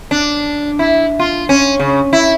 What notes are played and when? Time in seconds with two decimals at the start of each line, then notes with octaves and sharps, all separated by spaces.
0.11 D4
0.79 E4
1.19 F4
1.49 C#4
1.80 C#3
2.13 E4